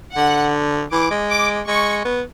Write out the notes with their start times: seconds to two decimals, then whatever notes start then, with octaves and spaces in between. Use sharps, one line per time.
0.15 D3 F#5
0.92 E3 D6
1.11 G#3
1.30 D6
1.67 G#3 C#6
2.05 B3